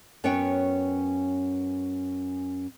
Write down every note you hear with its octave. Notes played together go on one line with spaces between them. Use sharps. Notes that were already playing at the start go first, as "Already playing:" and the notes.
F#2 B3 C#4 B4 C#5 G5